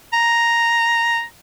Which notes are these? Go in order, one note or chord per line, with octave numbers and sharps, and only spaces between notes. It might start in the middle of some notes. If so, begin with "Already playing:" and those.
A#5